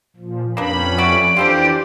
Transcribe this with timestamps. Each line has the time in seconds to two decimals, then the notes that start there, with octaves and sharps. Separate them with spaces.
0.16 A#2 F3
0.57 F2 A#3 C#4 D4 G4 B4 B5
0.98 A3 F#4 D5 D7
1.37 E3 D4 F4 G4 A4 C5